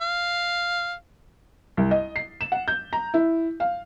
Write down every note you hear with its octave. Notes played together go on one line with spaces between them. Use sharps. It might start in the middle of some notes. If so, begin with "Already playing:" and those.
F5
C2
D#5
C7
E7
F#5
G6
A#5
E4
F5